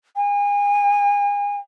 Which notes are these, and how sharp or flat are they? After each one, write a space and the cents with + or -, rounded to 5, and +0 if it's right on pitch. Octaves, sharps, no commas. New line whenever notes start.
G#5 -35